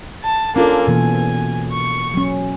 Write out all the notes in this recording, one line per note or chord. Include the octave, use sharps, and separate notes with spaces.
A5
A#3 C#4 D4 F4 A4
B2 E3 A#3 G#5
C#6
F#3 C#4